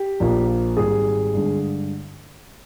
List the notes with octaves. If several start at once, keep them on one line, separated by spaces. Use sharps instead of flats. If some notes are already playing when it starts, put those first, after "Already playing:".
Already playing: G4
A#1 A#2 F3 A#3
G#1 G#2 G3 G#4
G2 D3 G#3